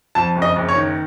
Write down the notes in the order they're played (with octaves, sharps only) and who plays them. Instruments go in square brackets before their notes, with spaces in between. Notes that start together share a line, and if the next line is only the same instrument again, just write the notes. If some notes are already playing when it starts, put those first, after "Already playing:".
[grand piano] F2 A5
F#1
D#5
F#1
C#5
D#3